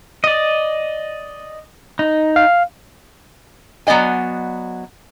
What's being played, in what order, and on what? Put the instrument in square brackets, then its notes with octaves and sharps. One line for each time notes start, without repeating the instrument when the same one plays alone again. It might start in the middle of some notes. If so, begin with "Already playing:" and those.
[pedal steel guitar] D5 D#5
D#4
[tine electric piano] F5
[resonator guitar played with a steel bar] F#3 B3 D5 D#5 G#5